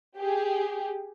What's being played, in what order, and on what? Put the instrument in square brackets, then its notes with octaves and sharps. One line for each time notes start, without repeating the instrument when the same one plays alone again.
[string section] G4 G#4